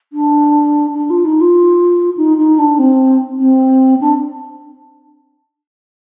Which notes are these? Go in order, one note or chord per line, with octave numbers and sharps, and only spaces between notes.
D4
D4
F4
D#4
F4
D#4
D#4
D4
C4
C4
D4